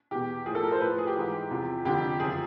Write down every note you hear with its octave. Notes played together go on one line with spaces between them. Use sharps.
E2 B2 G4
A2 F3 G#4
A4
A#4
C5
A2 F3 B4
G#4
G4
G#2 E3
E2 C3 F3
F2 D3 F3 G4
F#2 C#3 F3 G#4